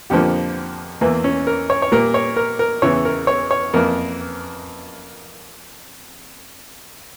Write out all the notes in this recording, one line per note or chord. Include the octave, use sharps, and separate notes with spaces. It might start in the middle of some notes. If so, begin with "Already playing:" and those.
F2 D3 F3 A#3 G4
E2 E3 A#3
C#4
A#4
C#5
C#5
A#2 G3 A#3 A#4
C#5
A#4
A#4
E2 C#3 E3 C#5
A#4
C#5
C#5
F2 E3 A#3 A#4